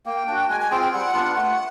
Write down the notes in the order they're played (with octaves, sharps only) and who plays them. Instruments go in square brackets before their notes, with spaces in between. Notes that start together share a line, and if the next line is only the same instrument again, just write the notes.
[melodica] A#3 [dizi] G5
[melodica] D4 F#4
[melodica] G#3 [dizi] G#5
[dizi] G#5
[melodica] C4 F4 G#4 [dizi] G5
[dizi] G5
[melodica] G3 [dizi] F#5
[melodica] B3 D4 F4
[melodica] A3 [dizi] F#5